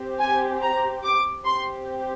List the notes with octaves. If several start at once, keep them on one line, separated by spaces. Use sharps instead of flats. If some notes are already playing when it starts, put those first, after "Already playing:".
Already playing: C4 G4
G#5
A#5
D6
C4 G4 C6